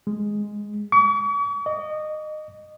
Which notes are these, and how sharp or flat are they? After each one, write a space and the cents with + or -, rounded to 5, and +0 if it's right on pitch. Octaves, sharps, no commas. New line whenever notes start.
G#3 +0
C#6 +45
D#5 -20